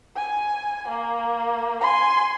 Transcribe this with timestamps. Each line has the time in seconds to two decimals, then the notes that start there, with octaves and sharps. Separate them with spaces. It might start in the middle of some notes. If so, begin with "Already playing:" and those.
0.16 G#5
0.88 A#3
1.81 G#5 C6